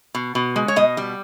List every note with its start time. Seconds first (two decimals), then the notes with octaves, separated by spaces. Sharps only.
0.15 B2
0.35 B2
0.56 G#3
0.68 C#5
0.76 B2 D#5
0.97 G3